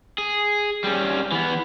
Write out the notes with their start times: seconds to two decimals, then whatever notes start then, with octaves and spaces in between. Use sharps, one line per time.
0.18 G#4
0.84 G3 C#4
1.32 E3 B3